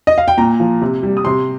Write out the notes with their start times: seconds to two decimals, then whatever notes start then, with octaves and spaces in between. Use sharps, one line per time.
0.07 D#5
0.18 F5
0.28 G5
0.38 A#2 A#5
0.60 F3
0.81 C3
1.03 G3
1.17 D#6
1.25 C3 C6